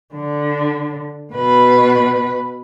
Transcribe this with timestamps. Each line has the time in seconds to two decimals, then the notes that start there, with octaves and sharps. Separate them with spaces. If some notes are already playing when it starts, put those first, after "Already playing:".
0.14 D3
1.33 B2 B4